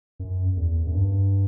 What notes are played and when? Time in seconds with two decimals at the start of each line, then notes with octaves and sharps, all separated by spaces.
0.20 F#2
0.57 E2
0.87 F#2
0.94 G2